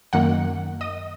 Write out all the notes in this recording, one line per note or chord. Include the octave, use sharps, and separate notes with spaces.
F#2 D#3 A#3 F#5 F#6
D#5 D#6